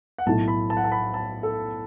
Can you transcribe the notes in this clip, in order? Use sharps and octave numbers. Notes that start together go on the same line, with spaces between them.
F#5
B1 A2 A3 A5
B5
A5
F#5
A5
B5
A5
A4